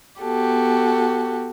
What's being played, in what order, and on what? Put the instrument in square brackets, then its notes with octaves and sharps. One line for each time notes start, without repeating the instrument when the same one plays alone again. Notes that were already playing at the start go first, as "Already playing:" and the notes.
[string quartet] B3 F#4 G4 A4